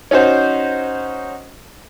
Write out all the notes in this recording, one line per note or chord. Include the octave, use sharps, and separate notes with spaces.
C#4 D#4 F#4 C5